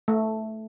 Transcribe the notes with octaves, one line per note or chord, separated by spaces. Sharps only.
A3